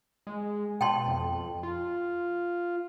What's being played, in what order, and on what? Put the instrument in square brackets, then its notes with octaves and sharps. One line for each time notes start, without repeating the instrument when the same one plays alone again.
[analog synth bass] G#3
[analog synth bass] B2 [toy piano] G5 A5 C6
[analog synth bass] F2
F4